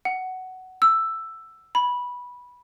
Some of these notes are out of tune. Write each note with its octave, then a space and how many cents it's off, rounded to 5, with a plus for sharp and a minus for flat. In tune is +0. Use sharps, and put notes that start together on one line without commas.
F#5 +10
E6 +5
B5 -10